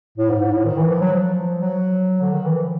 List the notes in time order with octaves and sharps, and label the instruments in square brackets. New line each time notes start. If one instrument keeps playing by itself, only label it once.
[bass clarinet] A2
G#2
G#2
A2
D#3
E3
F3
F#3
F3
F#3
D3
D#3
E3
F3